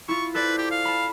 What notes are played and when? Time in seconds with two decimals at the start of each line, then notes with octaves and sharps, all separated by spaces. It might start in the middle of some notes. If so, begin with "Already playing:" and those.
0.08 E4 F4 C#6
0.35 A4 B4 C5 D5
0.58 G4
0.71 F5
0.85 A5 B5